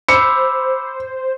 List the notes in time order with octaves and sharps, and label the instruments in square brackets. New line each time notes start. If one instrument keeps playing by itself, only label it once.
[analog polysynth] C5 [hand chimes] B5 D6 E6 [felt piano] C#7